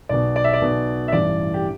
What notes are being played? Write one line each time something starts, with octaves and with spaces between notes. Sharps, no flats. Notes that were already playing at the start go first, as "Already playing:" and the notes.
B1 B2 D5
D5
E5
D5
B1 B2
E5
A1 G2 E3 D5
G4